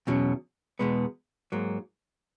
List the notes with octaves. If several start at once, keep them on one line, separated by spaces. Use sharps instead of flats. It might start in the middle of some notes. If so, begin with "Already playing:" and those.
E2 B2 F#3 C#4
E2 B2 G#3 B3
G#2 F#3 A#3